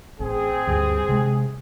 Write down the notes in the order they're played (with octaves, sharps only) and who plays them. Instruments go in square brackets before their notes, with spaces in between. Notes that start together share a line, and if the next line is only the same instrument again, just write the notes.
[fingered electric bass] A1 [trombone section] C4 G#4
[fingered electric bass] D2 G2
C3 F3 G#3